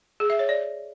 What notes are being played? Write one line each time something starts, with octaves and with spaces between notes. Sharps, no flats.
G#4
E5
C#5
D5